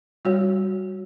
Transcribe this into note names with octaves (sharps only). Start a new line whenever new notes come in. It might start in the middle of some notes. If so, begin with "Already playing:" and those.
G3 F#4 C#5